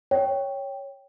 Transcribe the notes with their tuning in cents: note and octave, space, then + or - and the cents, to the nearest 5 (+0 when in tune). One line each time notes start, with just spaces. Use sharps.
C#5 +0 G5 +0